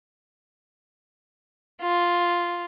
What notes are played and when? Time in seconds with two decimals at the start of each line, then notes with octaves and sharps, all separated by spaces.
1.82 F4